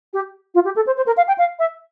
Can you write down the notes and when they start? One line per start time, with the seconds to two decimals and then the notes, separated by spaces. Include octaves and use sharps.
0.14 G4
0.55 F4
0.65 G4
0.76 A4
0.87 C5
0.97 C5
1.06 A#4
1.17 F5
1.28 G5
1.38 F5
1.59 E5